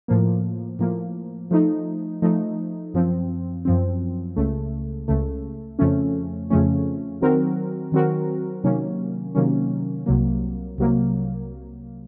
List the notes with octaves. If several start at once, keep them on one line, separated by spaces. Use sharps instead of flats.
A2 F3 A#3
A2 F3 A#3
F3 A3 D#4
F3 A3 D#4
F#2 F3 C4
F#2 F3 C4
C#2 C#3 A3
C#2 C#3 A3
F2 C#3 F3 A3 C#4
F2 C#3 F3 A3 C#4
D#3 F#3 C4 F#4 A#4
D#3 F#3 C4 F#4 A#4
C3 D#3 F#3 A#3 C#4
C3 D#3 F#3 A#3 C#4
C2 C3 F#3 A#3
C2 C3 F#3 A#3